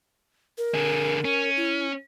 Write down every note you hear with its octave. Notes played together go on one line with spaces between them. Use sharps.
A#4
D3 G#4
C#4
E4